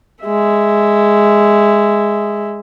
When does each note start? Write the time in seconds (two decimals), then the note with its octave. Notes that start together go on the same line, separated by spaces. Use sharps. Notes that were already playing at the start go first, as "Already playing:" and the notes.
0.24 G#3 E5